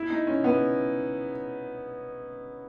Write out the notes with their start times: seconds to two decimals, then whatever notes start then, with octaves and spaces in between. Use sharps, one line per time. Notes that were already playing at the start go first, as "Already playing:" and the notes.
Already playing: E4
0.10 D#4
0.27 C#4
0.44 B3